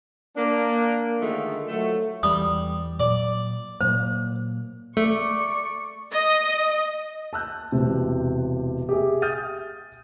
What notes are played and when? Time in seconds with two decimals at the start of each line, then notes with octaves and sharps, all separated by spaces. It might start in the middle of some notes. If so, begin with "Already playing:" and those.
0.37 A#3 D4
1.21 D3 D#3 F3 G#3 A3
1.68 F3 F#3 A3
2.23 E2 G3 D#6
3.00 A#2 F#3 D5
3.81 A#2 F#3 A#3 C5
4.97 A3 D5 C#6
6.12 D#5
7.33 A5 E6 F#6 G6
7.72 E1 C3
8.89 G4 G#4 E5
9.22 D#6 F6 G6 A6 D#7